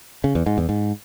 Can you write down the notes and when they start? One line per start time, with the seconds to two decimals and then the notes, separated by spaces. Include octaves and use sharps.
0.24 C#3
0.35 E2
0.46 G#2
0.58 E2
0.69 G#2